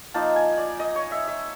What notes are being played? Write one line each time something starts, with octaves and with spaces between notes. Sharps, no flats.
F3 A#3 D#4 A5
G#5
D5
D#5
C#5
E5
E5